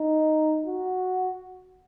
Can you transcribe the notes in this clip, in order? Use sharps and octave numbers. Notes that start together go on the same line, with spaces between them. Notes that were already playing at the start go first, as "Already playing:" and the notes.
Already playing: D#4
F#4